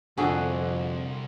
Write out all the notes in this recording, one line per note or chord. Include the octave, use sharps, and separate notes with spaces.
C2 F2 D3 F#4 G#4